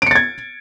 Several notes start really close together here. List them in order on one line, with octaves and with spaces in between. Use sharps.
D7 C#7 A6 G#6